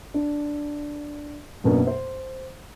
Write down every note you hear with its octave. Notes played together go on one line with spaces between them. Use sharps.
D4
F#2 B2 A#3 D4
C5